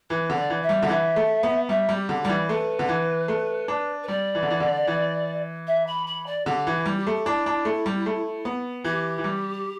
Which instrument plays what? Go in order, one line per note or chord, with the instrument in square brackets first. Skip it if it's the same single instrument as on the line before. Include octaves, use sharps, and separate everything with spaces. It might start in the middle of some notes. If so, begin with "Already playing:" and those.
[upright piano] E3 [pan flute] B4
[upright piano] D3
[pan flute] D5
[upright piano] E3
[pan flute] E5
[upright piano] G3
D3
[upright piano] E3 [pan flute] E5
[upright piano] A3
B3
[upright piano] G3 [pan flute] E5
[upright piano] G3
[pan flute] G4
[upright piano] D3
[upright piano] G3 [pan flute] D5
[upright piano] E3
[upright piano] A3 [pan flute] B4
[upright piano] D3
E3
A3
D4
[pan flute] B4
[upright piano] G3 [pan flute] D5
[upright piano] E3
D3
E3
D3
E3
[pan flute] E5
B5
B5
D5
[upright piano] D3 [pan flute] G4
[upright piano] E3
[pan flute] E4
[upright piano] G3
[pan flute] G4
[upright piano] A3
[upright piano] D4 [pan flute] E4
[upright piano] D4
A3
G3
A3
B3
[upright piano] E3 [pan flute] G4
[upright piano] E3
G3